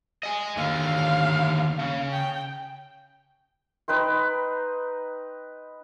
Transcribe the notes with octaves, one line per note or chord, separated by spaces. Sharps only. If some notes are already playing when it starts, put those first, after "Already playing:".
D#5 G#5
D#2 D3 F5
C#3
G5
D#4 B4 G5 C6